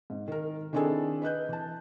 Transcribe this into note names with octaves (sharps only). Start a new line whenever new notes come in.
G#2
D#3 A#4
D#3 C4 D4 E4 G#4 A4
B4 D#5 F#6 G6
E3 A5